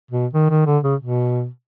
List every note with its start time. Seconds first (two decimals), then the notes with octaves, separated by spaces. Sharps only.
0.11 B2
0.34 D#3
0.50 D#3
0.67 D3
0.84 C#3
1.00 B2